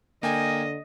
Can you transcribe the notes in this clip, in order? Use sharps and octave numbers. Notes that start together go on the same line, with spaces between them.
D3 A#3 D#5 G5 G#5